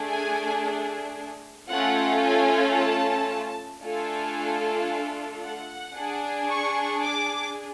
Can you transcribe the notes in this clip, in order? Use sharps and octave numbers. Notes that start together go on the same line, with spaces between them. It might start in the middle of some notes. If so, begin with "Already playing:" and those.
Already playing: A3 D4 G#4
G#5
A3 C#4 F4 A4 F#5
G#5
A5
A3 D4 F4 A4 G#5
F#5
D4 G#4
C#6
D6